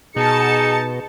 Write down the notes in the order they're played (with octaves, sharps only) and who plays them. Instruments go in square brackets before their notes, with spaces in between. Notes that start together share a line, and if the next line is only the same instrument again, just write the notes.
[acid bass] B2 [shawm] D#4 [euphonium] G#4 [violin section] A5 C#7